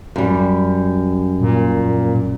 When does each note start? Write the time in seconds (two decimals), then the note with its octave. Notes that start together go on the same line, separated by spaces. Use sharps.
0.16 F#2 G3
1.41 A#2